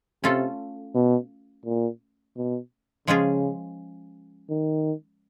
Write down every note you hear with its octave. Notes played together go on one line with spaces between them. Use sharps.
C3 A3 C#4 F4 A4
B2
A#2
B2
C#3 F3 G#3 C#4 F4 G#4
D#3